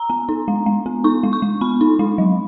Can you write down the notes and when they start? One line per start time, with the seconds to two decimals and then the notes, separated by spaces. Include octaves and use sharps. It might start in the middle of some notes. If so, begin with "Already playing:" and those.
Already playing: A#5
0.10 B3
0.29 D#4
0.48 G#3
0.66 G#3
0.86 B3
1.04 D#4 C#6
1.23 G#3
1.33 C#6
1.42 G#3
1.61 B3 B5
1.81 D#4
1.99 G#3
2.18 F#3